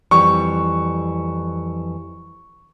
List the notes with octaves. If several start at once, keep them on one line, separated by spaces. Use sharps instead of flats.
F2 E3 G3 C#6